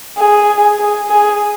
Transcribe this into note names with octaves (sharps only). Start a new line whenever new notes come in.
G#4
G#4
G#4